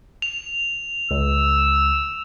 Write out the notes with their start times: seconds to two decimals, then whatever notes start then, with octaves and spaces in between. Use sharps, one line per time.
0.22 F7
1.11 C#2 E6